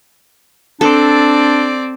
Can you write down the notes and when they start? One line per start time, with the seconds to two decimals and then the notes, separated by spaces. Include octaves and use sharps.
0.81 C4 D4 A4 D5